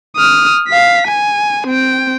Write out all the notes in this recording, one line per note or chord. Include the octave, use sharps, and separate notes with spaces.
D#6 F6
F5 B6
G#5
C4 G5